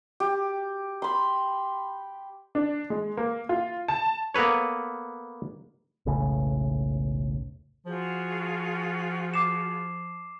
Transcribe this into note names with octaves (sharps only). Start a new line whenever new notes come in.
G4
B5 C6
D4
G#3
A#3
F4
A5
A#3 B3 A4 B4 C#5
E1 B1 A2 C#3
F3 F4 F#4 G#4
D6 C7 E7